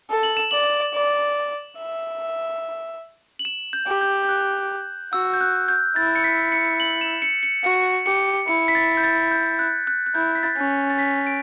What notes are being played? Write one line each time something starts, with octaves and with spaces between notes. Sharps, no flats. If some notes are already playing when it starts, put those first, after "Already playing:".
A4
F#7
E7
D5 F#7
D5
E5
F#7
E7
G6
G4
G6
G6
F#6
F#4 E6
G6
F#6
G6
E4 A6
C#7
B6
C#7
F#7
E7
C#7
C#7
F#4 C#7
G4 C#7
E4 C#7
B6
A6
G6
A6
G6
F#6
F#6
F#6
E4 G6
B6
A6
C#4
A6
B6
D7